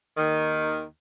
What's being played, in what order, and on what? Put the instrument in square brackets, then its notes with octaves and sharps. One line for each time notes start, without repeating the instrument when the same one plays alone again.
[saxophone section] D#2 D#3